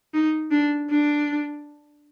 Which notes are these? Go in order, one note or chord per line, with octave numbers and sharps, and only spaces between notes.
D#4
D4
D4